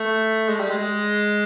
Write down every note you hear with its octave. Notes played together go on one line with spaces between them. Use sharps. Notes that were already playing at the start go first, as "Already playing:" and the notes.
Already playing: A3
G#3
G3
G#3